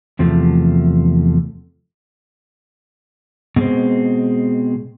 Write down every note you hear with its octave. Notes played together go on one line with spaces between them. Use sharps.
E2 C3 F3 A3
B2 G#3 C4